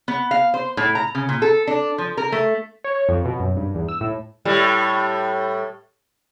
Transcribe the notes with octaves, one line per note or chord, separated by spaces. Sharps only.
B3
F5
C5
A2
A#5
C#3
A#2
A4
D4
F3
A#4
A3
C#5
C#5
F2
B2
F#2
G2
E2
E6
A2
A2 G3